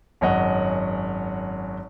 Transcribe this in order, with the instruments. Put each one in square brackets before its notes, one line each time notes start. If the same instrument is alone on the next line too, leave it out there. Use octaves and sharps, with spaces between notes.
[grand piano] G#1 F#2 C#5 D#5 F#5